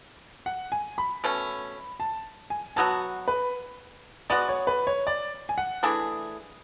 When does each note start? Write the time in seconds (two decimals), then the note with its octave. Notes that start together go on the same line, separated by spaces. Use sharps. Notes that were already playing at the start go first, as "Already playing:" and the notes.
0.46 F#5
0.72 G#5
0.98 B5
1.24 B2 A3 C#4
2.00 A5
2.50 G#5
2.76 B2 F#3 B3 F#4 A5
3.28 B4
4.30 G#3 B3 F#4 D5
4.49 C#5
4.67 B4
4.87 C#5
5.07 D5
5.49 G#5
5.58 F#5
5.83 E3 A3 D4 G#4